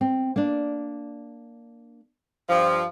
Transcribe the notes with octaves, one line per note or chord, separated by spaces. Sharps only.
C4
A#3 D4
G2 F3